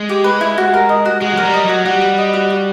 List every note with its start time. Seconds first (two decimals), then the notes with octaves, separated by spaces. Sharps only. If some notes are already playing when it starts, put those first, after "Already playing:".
Already playing: G#3
0.09 G4
0.24 B4
0.41 E4
0.58 F#4
0.74 A#4
0.89 D#5
1.05 F#4
1.21 G#3 F#4
1.34 F#3 A#4
1.43 G3
1.54 D#5
1.65 F#3 F#4
1.85 G3 F#4
2.01 B4
2.18 D#5
2.34 F#4
2.50 F#4